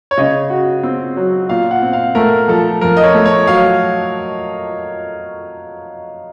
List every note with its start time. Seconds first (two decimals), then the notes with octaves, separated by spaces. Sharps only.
0.11 C#5
0.18 C#3 D#5
0.50 F#4
0.83 C4
1.17 F#3
1.49 A#2 F5
1.71 F#5
1.82 C4
1.93 F5
2.15 A3 A#4
2.48 F3 A4
2.81 F2 A#4
2.97 D#5
3.04 C#5
3.14 A3
3.25 C#5
3.47 F#3 F5